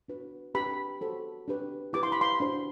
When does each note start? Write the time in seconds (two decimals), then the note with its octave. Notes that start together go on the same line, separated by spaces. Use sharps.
0.08 D4 F#4 B4
0.54 D4 G4 B4 B5
1.01 F#4 A4 C5
1.48 D4 G4 B4
1.93 E4 G4 B4 D6
2.03 C6
2.12 B5
2.21 C6
2.40 D4 F#4 C5